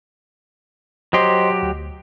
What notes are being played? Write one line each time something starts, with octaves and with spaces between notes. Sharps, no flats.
F#3 G4 C5 D#5 C6
D2